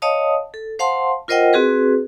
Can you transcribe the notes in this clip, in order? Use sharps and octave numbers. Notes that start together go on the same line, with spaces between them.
C#5 D#5 F5 A5 D#6
A4
C5 F5 F#5 A5 C6
F4 A#4 C5 D#5 F#5 G5
C4 F#4 G#4 B4